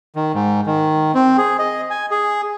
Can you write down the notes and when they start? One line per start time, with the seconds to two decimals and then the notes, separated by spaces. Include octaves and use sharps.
0.16 D#3
0.34 G#2
0.66 D#3
1.14 C4
1.38 G#4
1.59 D#5
1.90 G#5
2.11 G#4